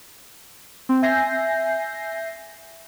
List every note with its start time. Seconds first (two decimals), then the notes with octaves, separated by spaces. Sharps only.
0.89 C4
1.02 E5 G#5 G6 A#6 C7